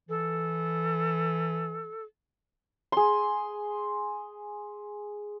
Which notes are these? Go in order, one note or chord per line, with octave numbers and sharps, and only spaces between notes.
E3 A4
G#4 C6